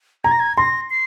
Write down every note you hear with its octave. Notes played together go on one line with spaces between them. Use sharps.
A#5 G#6
A#6
G#6
C6 A#6
C7